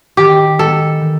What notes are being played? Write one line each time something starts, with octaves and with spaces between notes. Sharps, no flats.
D#3 G4
G#3 B3 A4
D#3